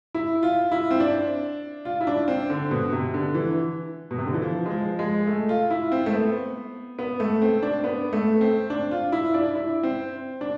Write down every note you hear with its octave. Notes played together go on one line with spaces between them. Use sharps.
E4
F4
E4
C4
D4
F4
E4
D4
C4
D3
B2
C3
D3
E3
B2
C3
D3
E3
F3
G#3
F3
G#3
A3
F4
E4
C4
A3
B3
B3
A3
C4
D4
B3
A3
C4
D4
F4
E4
D4
E4
C4
D4